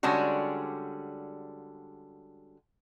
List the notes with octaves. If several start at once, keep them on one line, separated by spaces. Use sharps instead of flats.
D3 G3 G#3 C#4 D4 F#4